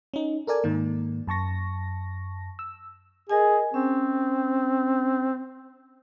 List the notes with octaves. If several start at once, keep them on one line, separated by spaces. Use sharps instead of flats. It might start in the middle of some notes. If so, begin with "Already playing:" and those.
C#4 D#4
A4 A#4 D5 G#5
G#2 D#3 A#3
F#2 A5 C#6 A#6
E6
G#4 A#4 D#5 G#5
C4 C#4